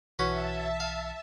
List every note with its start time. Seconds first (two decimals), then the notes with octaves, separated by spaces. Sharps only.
0.19 B1 E3 C#4 F#4 B4 E5 A5 C#7
0.80 F5